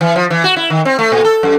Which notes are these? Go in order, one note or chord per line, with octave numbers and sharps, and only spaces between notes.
E3
F3
E3
F#4
E4
D#3
C4
A3
A#2
A4
F#2